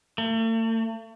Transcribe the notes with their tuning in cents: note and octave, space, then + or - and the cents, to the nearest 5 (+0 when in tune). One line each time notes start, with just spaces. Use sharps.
A3 +40